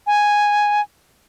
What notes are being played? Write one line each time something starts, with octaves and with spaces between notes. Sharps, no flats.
G#5